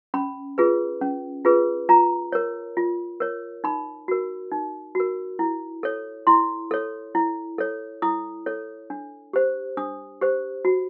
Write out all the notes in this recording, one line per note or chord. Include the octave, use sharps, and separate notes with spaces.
C#4 B5
F4 G#4 B4
C#4
F4 G#4 B4
F4 A#5
A#4 C#5
F4
A#4 C#5
D#4 B5
F#4 A#4
D#4
F#4 A#4
E4
A4 C#5
E4 C6
A4 C#5
E4
A4 C#5
E4 D#6
A4 C#5
D4
G4 C5
D4 D#6
G4 C5
F#4